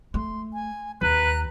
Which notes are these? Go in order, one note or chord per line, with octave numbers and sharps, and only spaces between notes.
A3 C6
G#5
D#2 B4 A#5 F#6